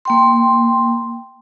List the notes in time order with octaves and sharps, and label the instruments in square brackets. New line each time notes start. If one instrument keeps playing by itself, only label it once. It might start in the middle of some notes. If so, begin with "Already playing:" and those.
[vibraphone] A#3 G5 C6